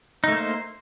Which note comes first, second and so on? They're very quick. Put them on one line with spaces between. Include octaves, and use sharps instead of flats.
D#4 A3 A#3 C5